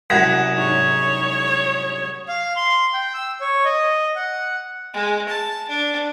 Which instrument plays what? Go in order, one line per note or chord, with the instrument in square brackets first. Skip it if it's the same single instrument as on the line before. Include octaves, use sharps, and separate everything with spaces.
[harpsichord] C2 F#2 [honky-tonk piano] F#5 A#6 B6 [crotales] D#6 G#6 E7
[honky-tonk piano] G#2 [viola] C#5
[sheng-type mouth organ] F5
C6
G5
E6
C#5
D#5
F#5
[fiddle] G#3
A5
D4